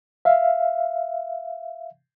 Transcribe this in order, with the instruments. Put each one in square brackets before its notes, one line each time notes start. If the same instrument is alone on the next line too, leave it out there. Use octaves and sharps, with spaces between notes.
[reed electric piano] E5 F5